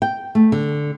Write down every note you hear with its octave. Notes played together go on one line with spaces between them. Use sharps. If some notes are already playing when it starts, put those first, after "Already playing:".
G5
A3
D3